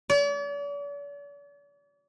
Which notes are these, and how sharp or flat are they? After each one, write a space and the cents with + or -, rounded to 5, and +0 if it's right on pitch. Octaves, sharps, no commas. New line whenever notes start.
D5 -45